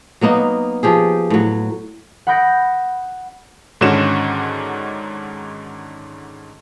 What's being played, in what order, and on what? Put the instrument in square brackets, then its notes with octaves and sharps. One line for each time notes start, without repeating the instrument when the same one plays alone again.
[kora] F#3 A#3 B3 D#4
F3 G4 G#4
A2 F#3
[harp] F#5 B5 D#6 G6 A#6 D7
[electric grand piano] G#2 D3 D#3 C#4 F#4 E7